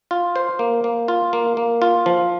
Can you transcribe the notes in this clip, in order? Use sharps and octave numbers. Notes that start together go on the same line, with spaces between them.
F4
C5
A#3
A#3
F4
A#3
A#3
F4
F3